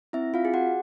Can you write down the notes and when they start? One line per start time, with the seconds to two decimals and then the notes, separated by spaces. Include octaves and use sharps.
0.13 C4 E4 E5
0.34 F4 F5
0.45 G#4
0.54 F#4 F#5